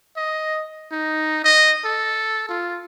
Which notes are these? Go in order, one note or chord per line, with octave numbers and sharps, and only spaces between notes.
D#5
D#4
D#5
A4
F4